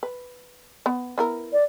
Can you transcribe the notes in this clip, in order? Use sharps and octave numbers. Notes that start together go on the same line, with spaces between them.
B4
B3
B3 E4 A#4
D5